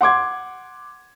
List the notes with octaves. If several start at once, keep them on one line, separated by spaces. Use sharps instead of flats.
F#5 C6 D6 G#6